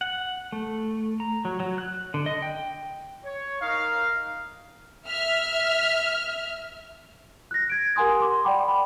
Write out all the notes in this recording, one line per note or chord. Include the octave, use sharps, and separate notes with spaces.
F#5
A3
A#5
F#3
F#3
F#6
D3
D#5
G5
C#5
D#4 A#4 F5
E5 F6
F#6 A#6
G#6 D7
G4 A#4 F#5 G#5 C6 D#6
C6 D6
D5 F#5 G5 B5 D6
B5